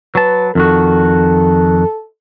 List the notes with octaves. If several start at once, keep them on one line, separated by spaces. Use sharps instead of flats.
F#3 B4 A5
F2 D#3 F#4 A4